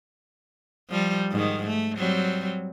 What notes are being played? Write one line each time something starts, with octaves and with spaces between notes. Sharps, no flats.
F3 G3
G#2 D#3
A3
F#3 G3 C4